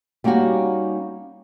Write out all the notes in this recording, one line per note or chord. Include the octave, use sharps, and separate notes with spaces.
G3 A#3 C#4 D#4 F#4 G4